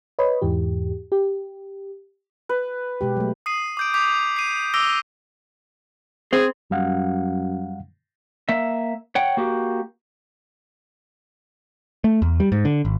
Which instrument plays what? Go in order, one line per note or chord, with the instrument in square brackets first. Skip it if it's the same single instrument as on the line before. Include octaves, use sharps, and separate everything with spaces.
[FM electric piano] B4 C#5 D#5 B5
E2 G#2 E3 G4
G4
[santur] B4
[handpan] B2 G#3 G4
F#3 A3
[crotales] D#6 C7 D#7
D6 G6 D7
D6 G6 B6 F7
C7 D#7
D6 E6 A#6 D7 F7 G7
[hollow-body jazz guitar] C4 C5 [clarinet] G#4
[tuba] F#2 [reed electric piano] G3 F5 F#5
[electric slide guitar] A#3 E5
C#5 F#5 G5
A#3 F#4 G4
[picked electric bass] A3
E2
G3
G#2
D3
G#1